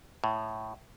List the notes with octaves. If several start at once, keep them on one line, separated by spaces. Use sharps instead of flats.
A2